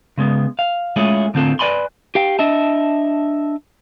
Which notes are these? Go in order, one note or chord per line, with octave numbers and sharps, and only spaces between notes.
C#3 G#3 B3
F5
G#3 A3 C#4 E4 F4 G#4
A2 D3 C4 F4 A4
B4 D5 G#5 B5 C6
G4 F5 G5
D4 D#5 E5 A5